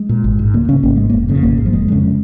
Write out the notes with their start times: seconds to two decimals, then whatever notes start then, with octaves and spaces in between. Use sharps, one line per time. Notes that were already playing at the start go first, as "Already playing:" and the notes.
Already playing: G#3
0.09 A#2
0.24 G#1
0.39 G#2
0.54 C#2 A#3
0.69 C#3 C#4
0.83 G#1 A#3
0.96 G#2 G#3
1.10 F1 A#3
1.29 F2 C#3
1.43 G#1 A#3
1.58 G#2
1.66 F3
1.73 F1 G#3
1.88 F2 C#3